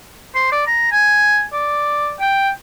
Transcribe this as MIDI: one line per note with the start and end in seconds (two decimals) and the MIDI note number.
0.35 0.48 72
0.52 0.62 74
0.67 0.87 82
0.92 1.44 80
1.53 2.14 74
2.20 2.49 79